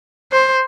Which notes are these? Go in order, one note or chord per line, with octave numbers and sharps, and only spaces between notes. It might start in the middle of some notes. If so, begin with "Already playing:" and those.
C5